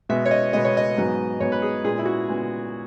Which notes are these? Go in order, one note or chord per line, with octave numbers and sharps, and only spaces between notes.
B2 G#3 B3 E5
C#5
D#5
B2 G#3 B3 D#5
C#5
D#5
G#2 F#3 B3
G#2 F#3 B3 C#5
B4
G#4
A#2 G#3 B3 G#4
E4
F#4
A#2 G#3 B3